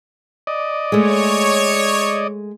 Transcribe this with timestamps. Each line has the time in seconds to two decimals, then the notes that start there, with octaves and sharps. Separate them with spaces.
0.47 D5 D#5
0.92 G#3 A3 C#5